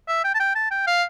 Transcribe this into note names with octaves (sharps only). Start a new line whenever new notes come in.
E5
G5
A5
G5
A5
G5
F5